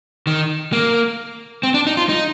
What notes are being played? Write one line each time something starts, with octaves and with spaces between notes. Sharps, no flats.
D#3
A#3
C4
D4
D#4
F4
D#4